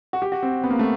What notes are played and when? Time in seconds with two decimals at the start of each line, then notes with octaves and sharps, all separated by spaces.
0.13 F#4
0.22 G4
0.32 F#4
0.43 C4
0.64 B3
0.70 A#3
0.79 A3